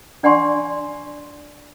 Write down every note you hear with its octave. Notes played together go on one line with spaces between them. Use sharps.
D4 D5 F#5 G#5 C6 C#6